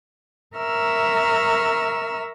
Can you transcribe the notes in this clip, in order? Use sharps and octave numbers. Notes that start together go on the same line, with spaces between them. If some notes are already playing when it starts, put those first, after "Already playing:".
A#4 E5 A#5 C#6 E6 F6